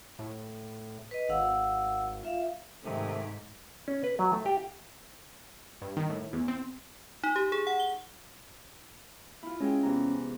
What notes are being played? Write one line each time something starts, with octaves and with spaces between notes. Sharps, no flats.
A2
B4 D#5
G#1 F5 F#5 E6
F4 E5 F5
G#2 C3 D#3 A3
C#4
B4
F#3
A3
G4
G2
D#3
A2
E2
C4
D#4
G4
G#4
F#5
G7
E4 F4
G#3 C#4 G#4 G5
E2 C3 A#5